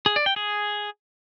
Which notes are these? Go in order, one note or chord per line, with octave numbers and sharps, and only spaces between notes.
G#4
D5
G5
G#4